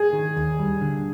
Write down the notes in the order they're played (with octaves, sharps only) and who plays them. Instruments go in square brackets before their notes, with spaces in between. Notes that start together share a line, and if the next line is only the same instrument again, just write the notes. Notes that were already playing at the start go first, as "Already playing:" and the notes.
Already playing: [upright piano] G#4
[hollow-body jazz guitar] D#3
D#2
G3
D3